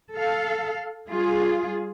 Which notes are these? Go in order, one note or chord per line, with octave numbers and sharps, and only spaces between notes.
A4 F5
G3 F4 G#4